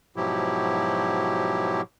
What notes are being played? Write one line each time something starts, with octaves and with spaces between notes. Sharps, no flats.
G#2 B2 F3 F#3 E4 G4